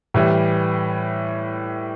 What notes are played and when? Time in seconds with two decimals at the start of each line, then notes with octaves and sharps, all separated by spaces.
0.14 A2 E3 G3